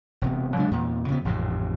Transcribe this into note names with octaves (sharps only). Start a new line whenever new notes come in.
E1 C3 B3
C#3 F#3 G#3 D4
E2 A#2
C#3 B3
A1 F2 G#2 C3